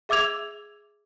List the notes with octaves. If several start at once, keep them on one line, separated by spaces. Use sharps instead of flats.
G#4 E5 D6 E6 G#6 F7